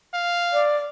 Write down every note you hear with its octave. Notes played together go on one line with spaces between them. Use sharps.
F5
D5